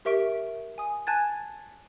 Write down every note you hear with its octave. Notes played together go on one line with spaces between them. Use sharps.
G4 A#4 E5 C#6 D7
G#5 D#6
G#5 A5 F#6 G#6 A6